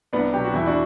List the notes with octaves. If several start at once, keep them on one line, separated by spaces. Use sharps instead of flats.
C2 B3 D4
B2 F#3 G4
F#4
E2 E4
D4 F#4